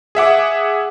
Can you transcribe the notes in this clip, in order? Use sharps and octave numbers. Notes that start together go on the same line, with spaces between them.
G#4 E5 F#5 D6